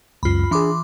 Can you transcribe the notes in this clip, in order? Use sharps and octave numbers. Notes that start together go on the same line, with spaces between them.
C#2 F#2 F4 B5
E3 D4 G#4 C6 D6